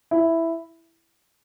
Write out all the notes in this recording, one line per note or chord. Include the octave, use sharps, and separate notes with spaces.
E4